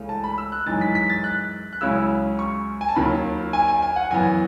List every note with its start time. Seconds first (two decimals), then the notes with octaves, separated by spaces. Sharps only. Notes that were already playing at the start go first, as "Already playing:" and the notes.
Already playing: C#2 C#3 E3 A3
0.09 A5
0.24 B5
0.38 E6
0.52 F#6
0.66 F#2 E3 G#3 D#4 A6
0.81 B6
0.95 B6
1.10 A6
1.24 F#6
1.73 F#6
1.81 C#2 C#3 F#3 C#4 E4 E6
2.39 C#6
2.81 G#5
2.89 A5
2.96 D#2 D#3 F#3 B5
3.53 G#5
3.68 G#5
3.82 G#5
3.96 F#5
4.11 F#2 E3 B3 G#5